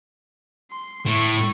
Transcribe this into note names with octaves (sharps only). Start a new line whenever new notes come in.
C6
A2 C#6